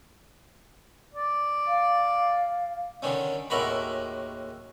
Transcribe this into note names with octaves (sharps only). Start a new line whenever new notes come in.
D5
F5
D3 D#3 G3 C#4
D#2 A2 G#3 F#4 A#4 B5